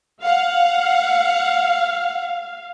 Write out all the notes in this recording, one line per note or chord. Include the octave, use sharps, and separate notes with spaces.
F5 F#5